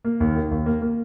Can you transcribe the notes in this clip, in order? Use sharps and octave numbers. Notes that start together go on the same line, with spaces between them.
A#3
D#2
D#3
D#2
A#3
A#3